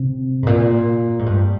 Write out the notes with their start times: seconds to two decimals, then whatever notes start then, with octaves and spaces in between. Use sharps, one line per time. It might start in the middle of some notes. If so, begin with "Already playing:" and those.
Already playing: C3
0.43 G#2
0.47 A#2
1.19 G#2
1.26 G2